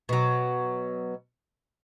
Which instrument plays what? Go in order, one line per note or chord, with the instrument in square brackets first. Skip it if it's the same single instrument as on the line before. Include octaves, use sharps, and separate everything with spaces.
[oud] B2 F#3